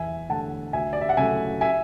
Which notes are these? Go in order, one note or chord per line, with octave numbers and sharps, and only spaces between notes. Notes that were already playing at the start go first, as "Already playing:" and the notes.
Already playing: E2 E5 G#5
D3 A3 F#5 A5
D2 E5 G#5
D5
E5
F#5
C#3 F#3 A3 E5 G#5
E5 G#5